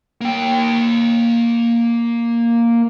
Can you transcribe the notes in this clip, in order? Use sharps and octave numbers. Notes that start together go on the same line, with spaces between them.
A#3 G5